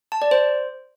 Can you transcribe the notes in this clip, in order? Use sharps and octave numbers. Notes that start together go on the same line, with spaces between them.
A5
D5
C5